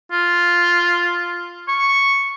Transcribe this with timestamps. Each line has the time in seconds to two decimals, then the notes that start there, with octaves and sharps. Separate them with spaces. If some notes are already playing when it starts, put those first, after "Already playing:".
0.12 F4
1.68 C#6